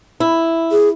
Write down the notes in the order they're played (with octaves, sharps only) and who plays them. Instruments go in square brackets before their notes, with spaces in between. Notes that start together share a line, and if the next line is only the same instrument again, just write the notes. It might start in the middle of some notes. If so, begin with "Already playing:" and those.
[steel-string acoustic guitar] E4
[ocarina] G#4